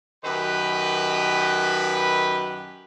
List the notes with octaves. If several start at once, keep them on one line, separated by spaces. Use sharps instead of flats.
F#2 D#3 G4 B4